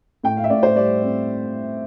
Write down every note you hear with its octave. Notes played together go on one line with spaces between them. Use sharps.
A2 G5
F5
E5
A2 D5
C5
G3 D5
C4